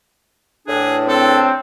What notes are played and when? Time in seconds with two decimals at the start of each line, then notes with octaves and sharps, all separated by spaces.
0.67 E2 A2 D4 G#4
1.08 C4 A4